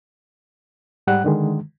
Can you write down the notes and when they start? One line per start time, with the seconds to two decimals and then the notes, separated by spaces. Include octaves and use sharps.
1.07 G#2 G3 F#5 F#6
1.24 D3 D#3 G#3